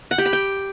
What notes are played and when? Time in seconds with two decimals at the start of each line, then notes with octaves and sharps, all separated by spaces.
0.11 F#5
0.18 G4
0.25 B5
0.33 G5